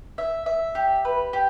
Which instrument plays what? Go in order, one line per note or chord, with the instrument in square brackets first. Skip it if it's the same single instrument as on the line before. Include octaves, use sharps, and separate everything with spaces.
[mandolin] E5
E5
G4
B4
G4